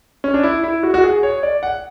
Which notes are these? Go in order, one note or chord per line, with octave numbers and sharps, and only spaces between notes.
C#4
D4
E4
E4
F#4
F#4
G#4
C#5
D5
F#5